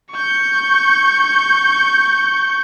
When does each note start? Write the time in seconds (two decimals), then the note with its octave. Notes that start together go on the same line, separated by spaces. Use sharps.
0.12 C#6 G6